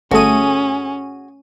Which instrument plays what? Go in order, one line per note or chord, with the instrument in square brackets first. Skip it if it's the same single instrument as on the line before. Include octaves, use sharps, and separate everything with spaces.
[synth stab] G1 A3 D#7 [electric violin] C#4 [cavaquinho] F#4 G#4